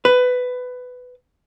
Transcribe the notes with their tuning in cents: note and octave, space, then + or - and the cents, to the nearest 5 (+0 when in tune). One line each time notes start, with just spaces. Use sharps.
B4 +15